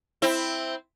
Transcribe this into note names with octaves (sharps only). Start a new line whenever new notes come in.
C4 E4